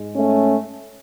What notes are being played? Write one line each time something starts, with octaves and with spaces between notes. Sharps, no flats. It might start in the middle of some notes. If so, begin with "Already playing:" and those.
Already playing: G#2 G#3
A3 C#4